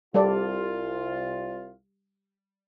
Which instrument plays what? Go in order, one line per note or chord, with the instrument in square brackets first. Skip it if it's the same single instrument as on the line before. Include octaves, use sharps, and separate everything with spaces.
[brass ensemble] C2 F4 [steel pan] G3 A4 D5